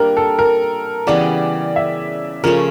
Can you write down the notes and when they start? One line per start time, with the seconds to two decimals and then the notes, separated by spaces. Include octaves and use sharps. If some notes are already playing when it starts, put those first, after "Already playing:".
Already playing: G3 A#3 D4 A#4
0.17 A4
0.39 A#4
1.07 C#3 E3 G3 B3 D5
1.76 E5
2.44 C#3 F3 A3 C#4 A#4